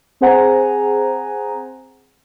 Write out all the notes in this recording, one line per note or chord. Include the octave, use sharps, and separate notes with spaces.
C4 G#4 C5 F#5 G#5 A#5